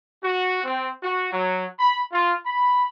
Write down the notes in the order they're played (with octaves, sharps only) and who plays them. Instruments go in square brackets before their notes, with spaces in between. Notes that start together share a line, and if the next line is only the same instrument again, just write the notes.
[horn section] F#4
C4
F#4
F#3
B5
F4
B5